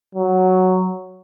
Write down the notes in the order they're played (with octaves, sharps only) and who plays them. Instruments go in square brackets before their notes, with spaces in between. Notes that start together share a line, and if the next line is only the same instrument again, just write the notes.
[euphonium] F#3